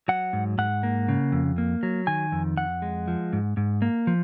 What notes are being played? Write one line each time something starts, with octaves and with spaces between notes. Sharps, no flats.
F#3 F#5
G#2
G#2 F#5
A#3
C#3
F2
A#3
F#3
D#3 G#5
F2
F2 F#5
G#3
F3
G#2
G#2
A#3
F3